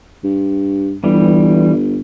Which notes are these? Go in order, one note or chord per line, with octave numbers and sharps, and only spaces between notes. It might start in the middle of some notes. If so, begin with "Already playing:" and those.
G2
G1 E3 G3